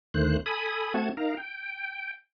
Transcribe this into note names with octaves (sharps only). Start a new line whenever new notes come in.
D#2 D3 D#3 A3 C5 F#6
A4 G#5 B5 D#6
A3 C4 F#4 F#5 A5 G#6
D#4 A#4 F5 A#5
G5